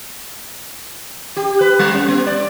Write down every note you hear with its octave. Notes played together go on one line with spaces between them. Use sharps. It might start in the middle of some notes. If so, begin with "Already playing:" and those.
G4
B4
G3
C#4
B3
D5